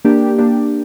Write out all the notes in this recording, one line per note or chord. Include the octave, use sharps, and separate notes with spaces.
A#3 D4 G4
A#3 D4 G4